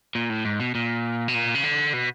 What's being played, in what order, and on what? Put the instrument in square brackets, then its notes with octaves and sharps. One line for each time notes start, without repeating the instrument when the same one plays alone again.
[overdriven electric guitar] A#2
A2
G#2
B2
A#2
B2
A#2
C#3
D3
B2